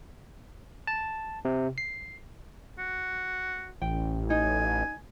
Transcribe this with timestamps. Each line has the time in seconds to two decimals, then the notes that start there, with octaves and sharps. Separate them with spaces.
0.87 A5
1.45 C3
1.78 C7
2.79 F#4
3.82 A1 G5
4.30 D#4 G#5